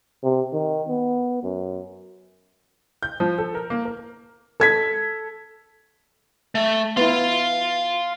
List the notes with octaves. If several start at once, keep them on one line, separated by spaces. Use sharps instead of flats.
C3
D#3
B3
F#2
G6
F3
A4
A#4
A#3
A#4
A4 G#6 B6
A3
B3 E4 F5 C6